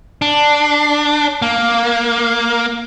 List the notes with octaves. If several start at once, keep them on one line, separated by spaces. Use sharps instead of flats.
D4
A#3